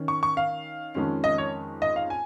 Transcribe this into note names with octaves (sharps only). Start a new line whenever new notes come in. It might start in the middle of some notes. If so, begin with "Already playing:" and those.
Already playing: D#3 C#4
C#6
C#6
F5
F2 D#3 G#3 C#4
D#5
C#5
D#5
F5
G#5